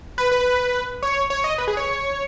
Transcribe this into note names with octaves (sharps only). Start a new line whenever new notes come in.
B4
B4
C#5
C#5
D#5
B4
G#4
C#5